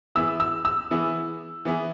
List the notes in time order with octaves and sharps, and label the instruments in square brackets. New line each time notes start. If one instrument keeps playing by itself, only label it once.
[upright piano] E3 B3 E4 G#4 [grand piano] E6
[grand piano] E6
E6
[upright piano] E3 B3 E4 G#4
E3 B3 E4 G#4